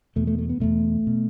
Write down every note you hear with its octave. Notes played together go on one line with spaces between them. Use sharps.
E2 B2 A3
A3
A3
B3
E2 B2 A3
B2